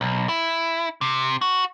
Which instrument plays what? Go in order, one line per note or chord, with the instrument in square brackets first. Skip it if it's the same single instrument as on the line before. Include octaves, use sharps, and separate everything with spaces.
[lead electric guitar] B1
E4
C3
F#4